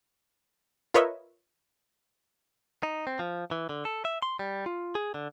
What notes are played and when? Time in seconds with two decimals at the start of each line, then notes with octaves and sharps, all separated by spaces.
0.94 F4 A#4 B4 C#5 D#5 E5
2.83 D#4
3.07 C4
3.19 F3
3.51 E3
3.69 D3
3.85 A4
4.05 E5
4.22 C6
4.39 G3
4.66 F4
4.95 G#4
5.14 D3